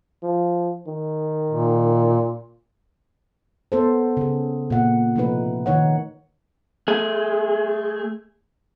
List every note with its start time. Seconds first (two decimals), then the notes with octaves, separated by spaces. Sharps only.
0.23 F3
0.87 D#3
1.51 A#2
3.72 B3 A4 C5
4.17 C#3 G#4
4.70 A#2 F#5
5.16 C3 F3 A3 D#4 B4
5.66 D#3 D#4 C#5 F#5
6.88 A3 G#4